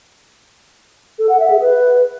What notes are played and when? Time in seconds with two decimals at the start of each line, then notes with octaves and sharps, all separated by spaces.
1.19 A4
1.29 F#5
1.40 E5
1.50 G#4
1.60 B4